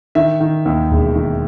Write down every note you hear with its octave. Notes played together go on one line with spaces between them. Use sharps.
D#3 E5
D#3
D#2
E1
D#3